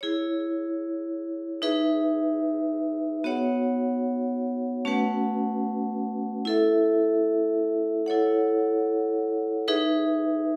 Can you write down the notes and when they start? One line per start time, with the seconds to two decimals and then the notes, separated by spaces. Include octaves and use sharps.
0.01 E4 G#4 C#5
1.62 D#4 G#4 B4 E5
3.24 B3 F#4 C#5 F#5
4.85 A3 C#4 F#4 B4 F#5
6.45 E4 A4 E5
8.06 E4 A4 C#5 F#5
9.68 D#4 G#4 B4 E5